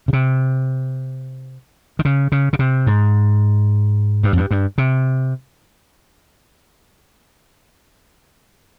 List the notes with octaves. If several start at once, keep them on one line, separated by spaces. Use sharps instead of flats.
C#3
C3
D#3
C#3
C#3
C#3
C3
G#2
G2
F2
G2
G2
C3